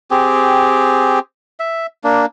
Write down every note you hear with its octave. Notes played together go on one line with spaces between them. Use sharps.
C4 G4 G#4
E5
A#3 D4